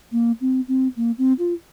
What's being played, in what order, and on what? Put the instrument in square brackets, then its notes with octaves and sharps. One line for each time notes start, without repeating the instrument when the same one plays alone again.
[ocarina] A#3
C4
C4
A#3
C4
F4